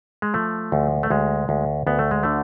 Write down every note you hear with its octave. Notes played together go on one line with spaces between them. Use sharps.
G#3
F3 A3
D2
A3
D2 G#3
D2
D2 B3
A3
G#3
D3 A3